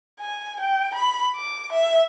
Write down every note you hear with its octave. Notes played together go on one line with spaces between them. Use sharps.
G#5
G5
B5
D6
E5